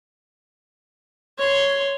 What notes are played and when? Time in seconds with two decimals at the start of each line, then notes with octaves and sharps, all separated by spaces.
1.38 C#5 C6